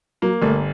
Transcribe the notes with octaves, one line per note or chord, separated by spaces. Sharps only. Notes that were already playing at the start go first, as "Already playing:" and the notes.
F#3 A#3
G1 A3